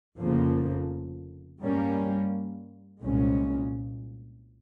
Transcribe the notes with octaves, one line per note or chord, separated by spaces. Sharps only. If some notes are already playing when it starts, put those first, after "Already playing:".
F1 F2 C#3 F3 A#3
G2 G3 A#3 C#4
C2 A#2 G#3 C#4